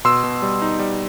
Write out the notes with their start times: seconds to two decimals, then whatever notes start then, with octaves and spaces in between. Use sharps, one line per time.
0.05 B2 C6 E6
0.24 B2
0.42 G3
0.62 D#4
0.79 G3